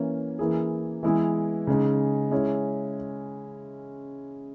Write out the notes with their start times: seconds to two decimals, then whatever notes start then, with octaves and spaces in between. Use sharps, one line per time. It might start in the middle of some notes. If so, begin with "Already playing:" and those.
Already playing: E3 A#3 C#4
0.39 E3 A#3 E4 G#4
1.03 E3 G#3 B3 E4 G#4
1.67 C#3 G#3 D#4
2.31 G#3 C#4 E4